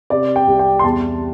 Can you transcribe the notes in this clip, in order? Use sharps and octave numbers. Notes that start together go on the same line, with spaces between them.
C3 D5
G5
C2
G5
C6
E2 A5